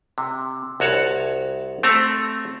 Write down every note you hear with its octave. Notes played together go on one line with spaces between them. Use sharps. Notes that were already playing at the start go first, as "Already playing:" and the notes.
C3
C2 F#4 C#5 F#5 A5
A3 C4 A4 E5 A#5